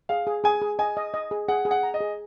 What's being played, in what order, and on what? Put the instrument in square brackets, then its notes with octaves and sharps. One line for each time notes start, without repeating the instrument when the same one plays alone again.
[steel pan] G#4 [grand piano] F5
[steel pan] G#4
[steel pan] G#4 [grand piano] G#5
[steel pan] G#4
[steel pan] D#5 [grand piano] G#5
[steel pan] D#5
D#5
G#4
[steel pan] G#4 [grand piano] F#5
[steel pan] G#4
[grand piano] F#5
[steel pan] A#5
[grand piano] D#5
[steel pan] G#4